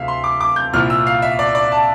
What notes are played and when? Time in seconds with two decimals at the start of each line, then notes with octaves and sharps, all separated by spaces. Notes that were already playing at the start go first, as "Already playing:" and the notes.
Already playing: D2 C3 A3 E5 F5
0.08 C6
0.24 D6
0.41 D6
0.56 G6
0.73 C2 A#2 F3 C4 E4 F6
0.90 E6
1.07 F5
1.22 E5
1.39 D5
1.55 D5
1.72 A5